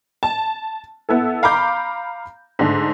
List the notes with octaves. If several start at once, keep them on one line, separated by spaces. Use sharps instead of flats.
A5
B3 E4 A4
F5 A#5 B5 D6 G6
G#2 D3 A3